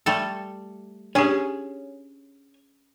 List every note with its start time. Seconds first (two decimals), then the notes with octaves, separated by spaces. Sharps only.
0.06 G3 A3 A4
1.15 C#4 D4 G4 G#4 C#5 G#5